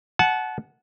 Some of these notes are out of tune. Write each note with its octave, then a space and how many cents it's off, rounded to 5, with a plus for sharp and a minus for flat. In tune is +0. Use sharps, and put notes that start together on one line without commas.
F#5 +0 A5 -30